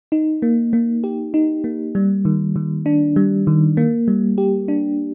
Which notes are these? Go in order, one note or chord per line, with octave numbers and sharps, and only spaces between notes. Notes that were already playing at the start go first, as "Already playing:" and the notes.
D#4
A#3
A#3
G4
D#4
A#3
G3
D#3
D#3
D4
G3
D#3
A#3
G3
G4
D4